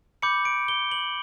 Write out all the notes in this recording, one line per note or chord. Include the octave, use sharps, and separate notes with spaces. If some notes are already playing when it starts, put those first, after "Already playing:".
B5 D6 G6 C#7
D7
G7
F#7